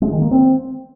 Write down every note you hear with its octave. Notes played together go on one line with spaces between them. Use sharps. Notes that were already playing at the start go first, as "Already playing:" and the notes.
G#3
D#3
A#3
C4